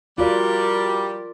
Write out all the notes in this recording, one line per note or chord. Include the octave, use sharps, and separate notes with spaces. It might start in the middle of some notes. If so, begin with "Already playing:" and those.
G3 F4 F#4 A#4 D5